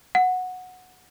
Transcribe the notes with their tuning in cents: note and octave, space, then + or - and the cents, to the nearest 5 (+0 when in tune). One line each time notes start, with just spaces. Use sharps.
F#5 -10